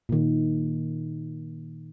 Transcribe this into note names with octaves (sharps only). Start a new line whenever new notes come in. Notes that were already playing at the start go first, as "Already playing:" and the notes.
A#2 D#3